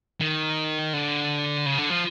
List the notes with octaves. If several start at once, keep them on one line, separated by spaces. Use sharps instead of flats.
D#3
D3
C#3
D3
F3